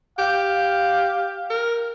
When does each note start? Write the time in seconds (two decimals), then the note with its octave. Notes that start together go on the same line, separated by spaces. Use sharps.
0.18 G4 F5
1.50 A#4